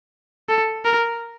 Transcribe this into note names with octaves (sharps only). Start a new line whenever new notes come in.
A4
A#4